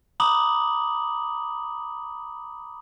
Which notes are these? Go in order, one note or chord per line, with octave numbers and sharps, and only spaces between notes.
A#5 B5 D6 D#6 F#7